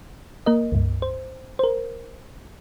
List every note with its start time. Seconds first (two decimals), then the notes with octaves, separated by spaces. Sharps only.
0.46 A#3 A#4 D#5
0.72 C#2 G2
1.02 C5
1.59 A#4 C5